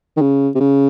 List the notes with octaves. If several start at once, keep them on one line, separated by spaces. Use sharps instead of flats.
D#3
C#3
C3
C#3